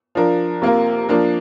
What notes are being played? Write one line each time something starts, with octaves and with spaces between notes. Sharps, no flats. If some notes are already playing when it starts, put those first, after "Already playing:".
F3 D4 A#4
C3 A#3 F4 A#4
F3 A#3 D4 A#4